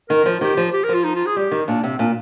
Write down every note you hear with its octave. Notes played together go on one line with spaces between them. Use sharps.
D#3 A#4
F3
D#3 G4
F3
G4
A#4
F3
F4
D#4
F4
G#4
G3 G4
D#3
A#2 D4
C3 C4
A#2 D4